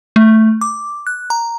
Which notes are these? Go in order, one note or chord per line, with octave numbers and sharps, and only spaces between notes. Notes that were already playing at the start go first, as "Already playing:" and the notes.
A3
D6
F#6
A#5